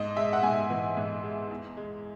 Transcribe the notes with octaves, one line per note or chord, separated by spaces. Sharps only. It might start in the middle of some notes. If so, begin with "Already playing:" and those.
Already playing: G#2 D#5
G#3 E5
F#5
G#2 G#5
E3
G#2
G#3
E2
G#3